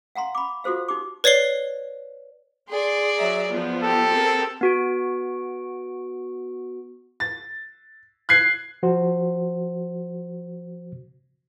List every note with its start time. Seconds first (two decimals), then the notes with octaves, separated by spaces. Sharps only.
0.15 F5 F#5 A#5 C6
0.35 B5 D6
0.64 F4 F#4 A4 C5 F5
0.88 D#4 G4 D6
1.24 B4 C#5 D5 C7 G7
2.69 G#4 D5 C6
3.17 F#3 E5 A#5
3.50 F3 B3 F4
3.84 G4 A4
4.14 C4 G#4 A#4
4.61 B3 F#4 D7
7.20 A6
8.29 F#6 G#6 C7
8.83 F3 F#4 C5